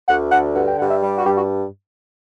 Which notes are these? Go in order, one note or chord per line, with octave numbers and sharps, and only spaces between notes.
D2 F#5
D3 F#5
G2 F#5
G5
G2 F#5
E5
G3
F#4
G2 G4
F#4